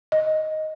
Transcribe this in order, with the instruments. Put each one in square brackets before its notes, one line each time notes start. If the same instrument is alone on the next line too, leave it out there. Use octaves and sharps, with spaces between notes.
[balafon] D#5